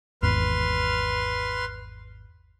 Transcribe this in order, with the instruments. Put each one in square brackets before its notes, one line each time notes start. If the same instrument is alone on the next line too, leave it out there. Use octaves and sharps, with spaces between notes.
[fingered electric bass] G#1 E2 G#2 [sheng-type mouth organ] B4 C6 F6